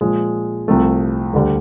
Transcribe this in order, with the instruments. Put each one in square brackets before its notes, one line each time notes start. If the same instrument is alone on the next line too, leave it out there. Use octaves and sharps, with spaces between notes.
[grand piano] A#2 F3 G#3
C2 C3 F3 A3
D2 D3 G3